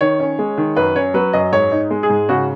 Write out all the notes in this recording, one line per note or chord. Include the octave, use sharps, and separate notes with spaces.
D#3 C#5
C#4
G#3
D#3
F#2 B4
C#4 C#5
F#3 B4
F#2 D#5
G#2 C#5
D#4
G#3
G#4
G#2
C#3 F#4